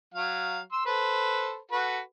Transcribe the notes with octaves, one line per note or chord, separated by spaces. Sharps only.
F#3 F5
C6 E6
A4 B4 C5
F#4 A4 B4